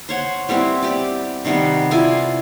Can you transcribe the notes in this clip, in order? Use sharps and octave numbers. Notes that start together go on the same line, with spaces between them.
C5 C#5 F#5
G3 B3 C4 E4
G4 D5
C3 D#3 G3 B3
E4 F4 D5 G#5